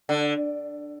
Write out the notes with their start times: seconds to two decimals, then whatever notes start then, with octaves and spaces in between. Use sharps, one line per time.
0.09 D3